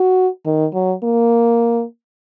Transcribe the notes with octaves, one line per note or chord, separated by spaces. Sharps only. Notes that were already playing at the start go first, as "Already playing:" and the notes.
Already playing: F#4
D#3
F#3
A#3